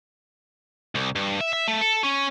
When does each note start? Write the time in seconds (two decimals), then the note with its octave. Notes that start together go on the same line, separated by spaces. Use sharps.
0.95 C2
1.15 G2
1.41 E5
1.53 E5
1.68 A3
1.81 A4
2.04 C#4